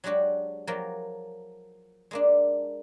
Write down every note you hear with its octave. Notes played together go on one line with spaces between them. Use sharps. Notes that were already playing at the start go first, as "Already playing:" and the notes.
F#3 G#3 D4 F#4 G4
F3 F#3 A#3 A#4 G5
G#3 A#3 D4